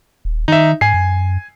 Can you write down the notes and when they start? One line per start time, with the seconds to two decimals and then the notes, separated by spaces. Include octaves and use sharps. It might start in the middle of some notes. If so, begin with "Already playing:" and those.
0.25 D#1
0.48 D#3 D#4 E5
0.81 G#2 G#5 C7
0.94 F#2